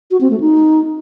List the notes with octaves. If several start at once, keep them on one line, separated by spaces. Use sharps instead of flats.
F#4
C4
A3
D#4